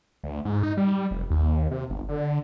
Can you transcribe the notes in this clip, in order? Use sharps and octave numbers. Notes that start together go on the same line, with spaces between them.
D2
G#2
D#4
G3
F1
D#2
C3
G1
D3